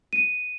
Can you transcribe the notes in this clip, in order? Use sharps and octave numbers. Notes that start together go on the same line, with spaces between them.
D#7